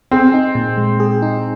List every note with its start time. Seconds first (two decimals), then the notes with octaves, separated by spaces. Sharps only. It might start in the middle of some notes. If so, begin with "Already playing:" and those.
0.11 C4 G#4
0.34 D#4
0.55 A#2
0.77 G#3
1.00 G#4
1.22 D#4